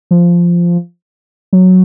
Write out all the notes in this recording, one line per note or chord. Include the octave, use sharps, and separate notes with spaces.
F3
F#3